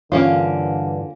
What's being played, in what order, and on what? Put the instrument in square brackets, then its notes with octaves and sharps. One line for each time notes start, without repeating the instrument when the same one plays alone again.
[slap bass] G2 E3 [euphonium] D3 [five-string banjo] A#3 C#4 F4